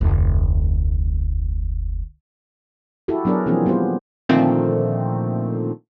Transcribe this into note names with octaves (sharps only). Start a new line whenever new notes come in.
F1 D2
E4 F#4 G4 A4
F#3 B3 D4 G#4 A#4
B2 E3 F3 A#3 C4 G#4
G3 B3 F4 G4 C5
A#2 D3 D#3 F3 A3 C4